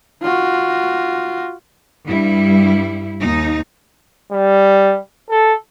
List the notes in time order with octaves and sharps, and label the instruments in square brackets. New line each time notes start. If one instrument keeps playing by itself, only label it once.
[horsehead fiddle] F4 F#4
[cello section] G2 G3 E4
D#2 D#4
[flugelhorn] G3
A4